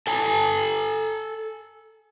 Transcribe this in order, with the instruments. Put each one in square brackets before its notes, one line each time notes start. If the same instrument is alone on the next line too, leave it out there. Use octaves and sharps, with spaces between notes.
[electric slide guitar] A4 G#5 A5